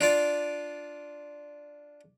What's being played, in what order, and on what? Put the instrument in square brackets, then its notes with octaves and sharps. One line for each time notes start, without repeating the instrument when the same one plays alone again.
[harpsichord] D4 F4 D5